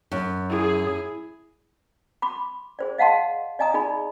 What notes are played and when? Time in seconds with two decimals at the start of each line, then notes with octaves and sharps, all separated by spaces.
0.12 F#2
0.49 E4 G#4
2.22 B5 C6 D6
2.79 G#4 C5 D5
2.98 D#5 F5 F#5 A5 C6
3.59 D5 D#5 G#5 A#5 D#6
3.74 D#4 G#4 D5 B5